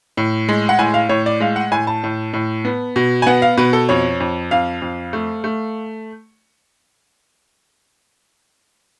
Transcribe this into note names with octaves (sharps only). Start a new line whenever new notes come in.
A2
G#3
F#5
A2 G#5
F5
A2 C#5
D5
G#3 F5
F#5
A2 G#5
A5
A2
A2
B3
B2
G#5
B3 F#5
F5
B2 B4
A4
F2 C#5
F2
F2 F5
F2
A3
A3